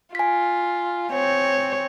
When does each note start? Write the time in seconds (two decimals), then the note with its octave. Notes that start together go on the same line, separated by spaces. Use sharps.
0.15 F4 G#5 B6
1.13 C4 C#5